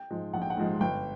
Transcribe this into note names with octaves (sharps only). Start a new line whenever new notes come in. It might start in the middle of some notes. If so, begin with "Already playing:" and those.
Already playing: G5
G#2 F3 G#3
A#1 F#5
G5
F#5
G#2 F3 G#3
G1 G5